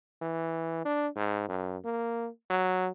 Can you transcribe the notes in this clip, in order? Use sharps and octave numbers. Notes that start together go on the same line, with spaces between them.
E3
D4
G#2
F#2
A#3
F#3